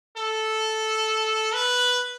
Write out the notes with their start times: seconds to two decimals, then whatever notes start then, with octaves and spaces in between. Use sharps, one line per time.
0.17 A4
1.54 B4